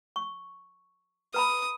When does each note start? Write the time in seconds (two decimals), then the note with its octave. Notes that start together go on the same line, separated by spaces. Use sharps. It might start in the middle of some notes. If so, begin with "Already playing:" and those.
0.16 C#6
1.34 B4 A#5 B5 D#6